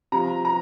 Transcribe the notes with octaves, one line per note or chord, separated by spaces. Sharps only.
C3 F3 A#5
A#5